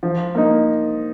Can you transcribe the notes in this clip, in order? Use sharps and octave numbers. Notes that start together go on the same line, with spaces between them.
F3
A#3 D#4